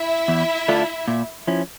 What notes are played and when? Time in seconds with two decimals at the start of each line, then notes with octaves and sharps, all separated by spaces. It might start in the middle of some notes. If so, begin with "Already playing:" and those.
Already playing: E4 E5
0.28 E2
0.68 D3 A3 D4 F4
1.08 A#2
1.47 F3 C#4 E4